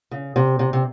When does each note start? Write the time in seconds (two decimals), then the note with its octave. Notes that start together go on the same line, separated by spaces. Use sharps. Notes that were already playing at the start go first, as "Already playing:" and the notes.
0.11 C#3
0.36 C3
0.59 C3
0.73 C3